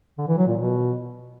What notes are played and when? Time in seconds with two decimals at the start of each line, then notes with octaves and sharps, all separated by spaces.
0.18 D3
0.28 E3
0.38 F#3
0.47 A#2
0.57 B2